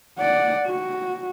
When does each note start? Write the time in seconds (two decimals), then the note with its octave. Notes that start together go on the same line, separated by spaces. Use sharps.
0.18 D5 F#5
0.66 F#4